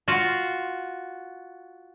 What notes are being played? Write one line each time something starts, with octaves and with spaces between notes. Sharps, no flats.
F4 F#4